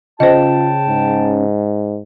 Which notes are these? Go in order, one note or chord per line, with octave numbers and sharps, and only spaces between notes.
C#3 F4 C5 D#5 G5 A5
G#2